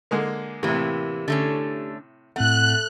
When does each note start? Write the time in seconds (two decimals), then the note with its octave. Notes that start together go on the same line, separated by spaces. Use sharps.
0.11 D3 G#3 A#3
0.63 A2 C3 E3 A#3 G4
1.28 D3 A3 C#4
2.36 A2 A3 C4 F#5 F#6